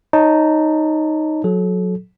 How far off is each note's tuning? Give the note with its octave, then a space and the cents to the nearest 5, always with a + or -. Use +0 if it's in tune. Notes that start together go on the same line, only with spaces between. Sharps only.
D#4 +0 C#5 +0 A5 +25
F#3 -20 A4 -35